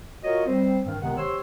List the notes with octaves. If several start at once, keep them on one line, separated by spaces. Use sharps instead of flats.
F4 F#4 A#4 C#5 D#5
G3 C4 C5
G2 D#3
C#2 C3 D#3 G#3 B3 F#5
G4 C5 C#5 C6 E6